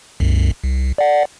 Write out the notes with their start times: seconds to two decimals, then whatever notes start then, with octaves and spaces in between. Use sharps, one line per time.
0.20 C2 F#2
0.64 C2
0.98 D5 F#5